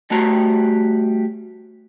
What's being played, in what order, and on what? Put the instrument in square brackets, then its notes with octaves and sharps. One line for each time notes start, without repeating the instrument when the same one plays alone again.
[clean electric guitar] G3 A3 F#4 A#5